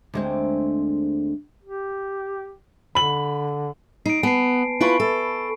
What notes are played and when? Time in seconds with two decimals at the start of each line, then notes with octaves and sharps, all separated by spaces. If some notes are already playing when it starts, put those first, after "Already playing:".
0.14 D2 G#3 C4
1.64 G4
2.95 D3 B5 F#7
4.06 D#4 C7 D7
4.23 B3 G#5 A5 C7
4.81 E4 F4 B4 B5 C#6 D7
5.00 A4